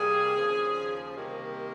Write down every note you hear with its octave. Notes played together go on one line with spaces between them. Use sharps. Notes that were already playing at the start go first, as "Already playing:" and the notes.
Already playing: C3 G3 A#3 G#4
D#2 C#3 F3 A#3
C3 D#3 G3 A#3 G4